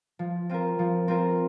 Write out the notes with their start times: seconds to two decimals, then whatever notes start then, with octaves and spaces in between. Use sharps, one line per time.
0.19 F3
0.49 C4 F4 A#4
0.79 F3
1.08 C4 F4 A#4